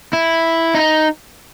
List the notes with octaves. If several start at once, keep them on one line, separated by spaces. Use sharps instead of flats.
E4
D#4